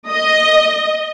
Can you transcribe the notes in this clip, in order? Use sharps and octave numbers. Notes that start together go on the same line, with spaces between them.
D#5